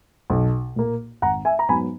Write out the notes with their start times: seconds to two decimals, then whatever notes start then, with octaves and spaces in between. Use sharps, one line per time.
0.30 B1
0.76 A#2 A#3
1.22 G#1 F#5 A#5
1.45 E5 G#5
1.59 A#5
1.69 G#2 F#3 B3 G#5 B5